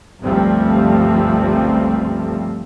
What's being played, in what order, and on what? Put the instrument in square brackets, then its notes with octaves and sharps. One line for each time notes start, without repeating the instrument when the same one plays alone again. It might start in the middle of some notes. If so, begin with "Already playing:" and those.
[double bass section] G1 C#2 F3 G3 A3 C4